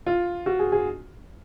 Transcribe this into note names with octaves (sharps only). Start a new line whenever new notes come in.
F4
F#4
G#4
G#4